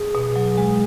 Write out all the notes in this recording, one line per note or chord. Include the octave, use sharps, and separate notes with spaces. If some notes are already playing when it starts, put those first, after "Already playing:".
Already playing: G#4
B2
F#3
G#3